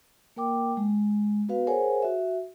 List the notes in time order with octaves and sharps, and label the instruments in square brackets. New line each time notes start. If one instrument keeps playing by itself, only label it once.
[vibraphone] A#3 A#4 G5 D6
G#3
B3 F#4 B4 F5
G#4 A#4 C5 C#5 F#5 G#5
F#4 E5